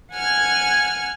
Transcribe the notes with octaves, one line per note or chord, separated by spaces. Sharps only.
F#5 G#5 F6 G#6